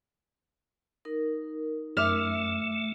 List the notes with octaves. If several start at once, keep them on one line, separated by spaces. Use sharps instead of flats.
D#4 A#4
F#2 A3 E5 D6 F6